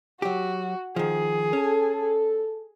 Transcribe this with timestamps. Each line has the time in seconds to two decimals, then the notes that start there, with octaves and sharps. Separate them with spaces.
0.22 F#3 F#4 G4
0.96 D#3 F3 G#4
1.53 C#4 A4